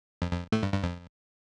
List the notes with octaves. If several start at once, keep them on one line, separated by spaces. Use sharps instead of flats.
F2
F2
A2 A3
G2
G2
F2